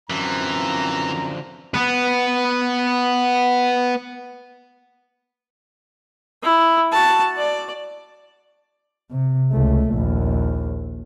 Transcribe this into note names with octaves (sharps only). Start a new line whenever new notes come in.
F#2 D3 E3 F3 C4 A#5
B3 B4
E4
F#4 A5
D5
C3
C#2 A3
A#1 D#2